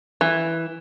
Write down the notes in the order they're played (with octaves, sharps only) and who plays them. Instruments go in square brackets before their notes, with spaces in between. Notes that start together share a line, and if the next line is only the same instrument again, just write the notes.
[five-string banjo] E3